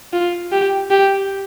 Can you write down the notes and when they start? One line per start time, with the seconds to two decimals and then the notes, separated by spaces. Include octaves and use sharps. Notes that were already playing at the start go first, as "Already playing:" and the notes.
0.13 F4
0.52 G4
0.90 G4